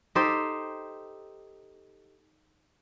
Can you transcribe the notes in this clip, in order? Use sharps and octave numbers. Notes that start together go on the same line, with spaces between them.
D#4 G4 A4 C5